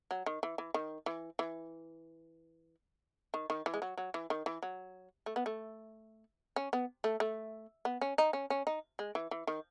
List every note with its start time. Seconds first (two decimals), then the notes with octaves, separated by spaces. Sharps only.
0.11 F#3
0.26 D#3
0.43 E3
0.58 E3
0.74 D#3
1.06 E3
1.39 E3
3.34 D#3
3.50 D#3
3.66 E3
3.74 G#3
3.82 F#3
3.98 F#3
4.14 E3
4.30 D#3
4.46 E3
4.63 F#3
5.26 A3
5.36 B3
5.46 A3
6.56 C#4
6.73 B3
7.04 A3
7.20 A3
7.85 B3
8.01 C#4
8.18 D#4
8.33 C#4
8.50 C#4
8.67 D#4
8.99 G#3
9.15 E3
9.31 E3
9.47 D#3